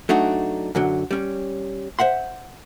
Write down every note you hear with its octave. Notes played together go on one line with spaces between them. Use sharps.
F#3 A3 D4 D#4 F#4
F#2 D3 F#3
G3 C#4
C5 E5 F#5 C6